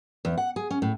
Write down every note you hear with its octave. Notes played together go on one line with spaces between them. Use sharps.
E2
F#5
G#4
C#4
A2